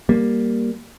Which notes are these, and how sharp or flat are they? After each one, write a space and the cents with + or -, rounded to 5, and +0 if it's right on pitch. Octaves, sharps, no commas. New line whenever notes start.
G3 +0 A#3 +0